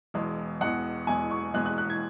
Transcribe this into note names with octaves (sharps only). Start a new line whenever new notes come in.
E1 E2 B2 G#3
E1 E2 B2 G#3 F#5
E1 E2 B2 G#3 G#5
C#6
E1 E2 B2 G#3 F#6
F#6
F#6
G#6